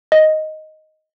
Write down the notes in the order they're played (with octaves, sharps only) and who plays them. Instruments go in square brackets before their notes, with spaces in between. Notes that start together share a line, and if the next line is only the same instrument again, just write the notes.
[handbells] D#5